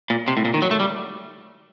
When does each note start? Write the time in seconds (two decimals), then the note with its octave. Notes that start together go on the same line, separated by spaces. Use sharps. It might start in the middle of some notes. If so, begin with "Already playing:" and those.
0.10 A#2
0.28 C3
0.37 A2
0.45 A#2
0.54 D#3
0.62 F#3
0.71 A3
0.80 G3